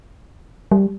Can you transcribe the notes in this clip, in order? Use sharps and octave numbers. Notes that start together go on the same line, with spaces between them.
G3